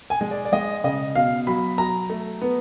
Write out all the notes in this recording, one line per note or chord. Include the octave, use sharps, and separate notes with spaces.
G#5
G#3
D5
D5
G#3 D#5
C#3 D#5
B2 F5
F#3 B5
F#3 A#5
A3
B3